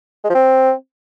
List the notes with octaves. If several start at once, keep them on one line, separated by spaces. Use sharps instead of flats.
G#3
F3
C4